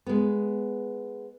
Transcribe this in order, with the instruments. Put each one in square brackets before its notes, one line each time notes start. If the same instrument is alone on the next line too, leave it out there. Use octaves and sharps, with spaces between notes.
[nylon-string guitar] G#3 B3